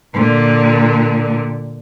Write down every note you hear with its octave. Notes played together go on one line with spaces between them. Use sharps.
A#2 D3